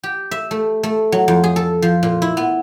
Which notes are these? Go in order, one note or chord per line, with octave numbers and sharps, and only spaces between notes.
G4
E5
A3
A3
F#3
F2
G#4
A4
F3
A#2
E4
B3